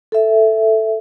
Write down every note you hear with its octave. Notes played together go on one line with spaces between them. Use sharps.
A4 E5